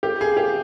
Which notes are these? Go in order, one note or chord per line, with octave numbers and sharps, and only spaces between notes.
G4
G#4
G4